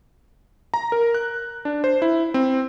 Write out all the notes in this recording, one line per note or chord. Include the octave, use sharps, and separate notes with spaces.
A#5
A#4
F#6
D4
C5
E4
C4